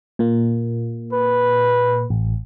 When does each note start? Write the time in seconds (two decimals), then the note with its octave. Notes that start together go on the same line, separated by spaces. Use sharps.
0.19 A#2 A#3
1.13 B4
2.10 A1